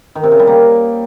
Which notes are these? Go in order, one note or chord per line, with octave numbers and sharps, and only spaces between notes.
D#3
C3
C#3
G3
A#3